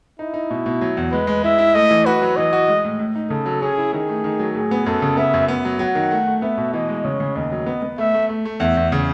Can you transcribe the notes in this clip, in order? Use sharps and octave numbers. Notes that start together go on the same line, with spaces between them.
D#4 E4
D#4
B2
B2
F#3
E2
G#3 B4
G#3
E4 E5
E4
A3 D#5
E3
F#4 B4
F#3
E3 D#5
F#4
G#3
A2
A2
D#4
C#3 A4
F#3
C#4 G#4
E4
D#3 G#4
A3
D#3
F#3
A2 G#4
B3
F#2 A4
C#3
B3 E5
F#2
B3
F#3
F#3 F#5
D#3
A3
A3
B3 E5
B2
E3 D#5
G#3
C#3 C#5
C#3
D#2 D#5
F#3
B3
B3
A3 E5
A3
A3
A3
E2 E5
E2
C#3